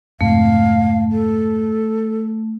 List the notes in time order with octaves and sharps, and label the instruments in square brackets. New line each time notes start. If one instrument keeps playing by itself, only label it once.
[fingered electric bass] F2 G#2 C3 [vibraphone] A3 [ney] F5
[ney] A4